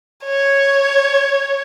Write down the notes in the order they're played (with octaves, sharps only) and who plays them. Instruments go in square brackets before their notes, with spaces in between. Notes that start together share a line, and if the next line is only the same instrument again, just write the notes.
[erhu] C#5